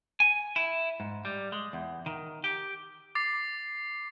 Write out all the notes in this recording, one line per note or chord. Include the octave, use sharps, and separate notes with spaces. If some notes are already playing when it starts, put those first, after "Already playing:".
G#5
E4
G#2
G3
G#3
E2
D#3
G4
D6 A6 C7